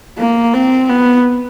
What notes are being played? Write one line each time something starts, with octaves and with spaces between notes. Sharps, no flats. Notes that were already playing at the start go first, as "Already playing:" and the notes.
A#3
C4
B3